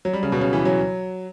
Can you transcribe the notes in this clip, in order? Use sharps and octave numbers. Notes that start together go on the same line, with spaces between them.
F#3
G3
C#3
B2
C#3
E3
F#3